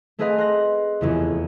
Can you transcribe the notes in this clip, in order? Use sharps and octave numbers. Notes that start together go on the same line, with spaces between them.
A3 C4 G#4 B4 D#5 F5
C5 F#6 A#6
F1 E2 C#3